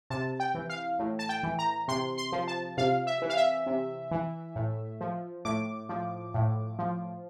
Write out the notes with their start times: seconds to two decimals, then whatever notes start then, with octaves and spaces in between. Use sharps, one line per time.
0.10 C3 A5
0.40 G5
0.55 E3
0.70 F5
0.99 A2
1.19 A5
1.29 G5
1.43 E3
1.59 A#5
1.88 C3 C6
2.18 C6
2.32 F3
2.48 A5
2.78 C3 F5
3.07 E5
3.22 E3
3.30 F5
3.37 E5
3.66 C3
4.11 E3
4.56 A2
5.01 F3
5.45 A2 D6
5.89 F3
6.34 A2
6.79 F3